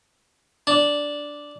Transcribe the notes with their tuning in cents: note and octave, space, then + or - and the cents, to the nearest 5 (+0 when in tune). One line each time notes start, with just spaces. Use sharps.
D4 -5